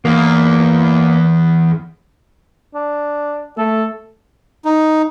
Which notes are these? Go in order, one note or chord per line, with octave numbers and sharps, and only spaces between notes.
E2 A#3
D4
A3 A4
D#4